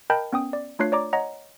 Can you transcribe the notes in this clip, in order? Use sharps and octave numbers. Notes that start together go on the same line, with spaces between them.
A#4 D#5 G5 A5 B5 G6
B3 C#4 G5 D#6
D5
A3 D4 F4 C#5 F#6 C7
C#5 D5 A#5 D6
C#5 D#5 F#5 A#5